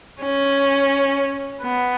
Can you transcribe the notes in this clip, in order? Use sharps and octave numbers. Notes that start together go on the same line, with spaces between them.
C#4
B3